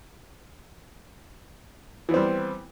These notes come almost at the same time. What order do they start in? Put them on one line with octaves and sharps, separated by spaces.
E3 B3 C4 G3